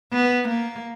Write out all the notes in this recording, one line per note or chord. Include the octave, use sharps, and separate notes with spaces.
B3
A#3